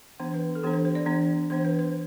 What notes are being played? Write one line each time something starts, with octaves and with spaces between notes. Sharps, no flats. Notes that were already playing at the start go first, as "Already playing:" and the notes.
E3 B3 D4 C5
B4
A4
E3 B3 D4 G4
C5
C5
D5
E3 B3 D4
E3 B3 D4 C5
B4
C5